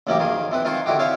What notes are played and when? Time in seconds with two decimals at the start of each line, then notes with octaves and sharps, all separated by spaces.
0.07 A1 F#2 A#3 C#4 D#4 G4
0.19 D#3 F3 G#4
0.52 E3 C4 B4
0.65 D#3 F3 F4 C5 G#5 C#6
0.86 D3 D#3 E4 F#4 G4
0.99 E4 C5 C#5 F5 G#5